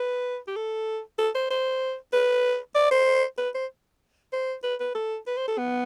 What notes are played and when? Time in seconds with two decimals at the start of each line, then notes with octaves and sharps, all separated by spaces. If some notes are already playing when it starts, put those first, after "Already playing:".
Already playing: B4
0.47 G4
0.56 A4
1.18 A4
1.35 C5
1.51 C5
2.13 B4
2.75 D5
2.91 C5
3.38 B4
3.55 C5
4.33 C5
4.64 B4
4.80 B4
4.95 A4
5.27 B4
5.37 C5
5.48 A4
5.58 B3